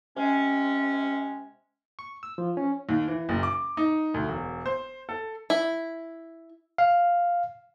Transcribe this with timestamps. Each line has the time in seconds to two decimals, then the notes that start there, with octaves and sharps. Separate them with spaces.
0.17 C3 G#3 C#4
1.99 C#6
2.23 E6
2.38 F3
2.57 C#4
2.89 D#2
3.08 E3
3.29 F#1
3.43 D6
3.77 D#4
4.14 D2
4.28 E1
4.66 C5
5.09 A4
5.50 E4
6.78 F5